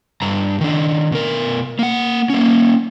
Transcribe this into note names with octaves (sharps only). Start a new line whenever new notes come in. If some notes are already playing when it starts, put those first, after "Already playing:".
G2 A#5
D#3 D4
B2 A#4
A#3 F#5
A#3 C#4